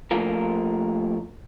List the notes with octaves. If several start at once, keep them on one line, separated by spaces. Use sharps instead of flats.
F3 A3 A#3 F4 A#4